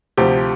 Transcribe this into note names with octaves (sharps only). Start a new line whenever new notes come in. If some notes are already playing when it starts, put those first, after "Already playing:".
D2 C3 F3 G4